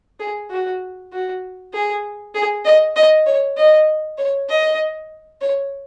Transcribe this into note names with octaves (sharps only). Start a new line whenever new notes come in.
G#4
F#4
F#4
G#4
G#4
D#5
D#5
C#5
D#5
C#5
D#5
C#5